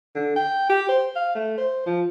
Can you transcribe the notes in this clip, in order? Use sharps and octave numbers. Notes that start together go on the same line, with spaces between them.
D3
G5
G4
C5
F5
A3
C5
F3